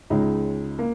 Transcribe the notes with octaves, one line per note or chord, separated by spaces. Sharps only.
C#2 C#3 G#3 D#4
A#3